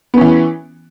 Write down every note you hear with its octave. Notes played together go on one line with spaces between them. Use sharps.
E3 B3 C#4